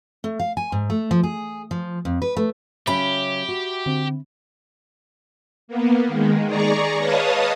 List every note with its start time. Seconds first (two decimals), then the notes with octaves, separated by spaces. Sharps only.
0.24 A3
0.39 F5
0.57 G#5
0.72 G#2
0.90 A3
1.11 F3
1.23 G#4
1.71 F3
2.05 F2
2.22 B4
2.37 A3
2.87 C#3 F#3 C#4 G4 E5 B5
3.49 F#4
3.86 D3 C4
5.68 A#3 B3
6.08 D#3 G#3
6.46 G#4 D5 A#5 C#6
6.98 B4 C#5 D#5 F5 A5 D#6